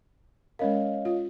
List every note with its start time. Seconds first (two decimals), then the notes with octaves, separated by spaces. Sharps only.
0.59 G#3 C#4 A#4 C#5 D#5 F5
1.05 F4